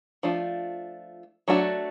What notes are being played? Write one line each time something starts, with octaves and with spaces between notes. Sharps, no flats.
F3 A3 D4 F4
F#3 A3 D4 F#4